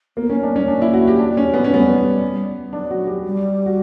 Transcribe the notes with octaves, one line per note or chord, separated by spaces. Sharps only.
A#3 B3
A#3 C#4
D4
G3 C#4
A#3 D4
E4
F#4
G4
D4
C#4
B3
C#4
G3 B3
F#3 D4
F#4
G4
G3
F#4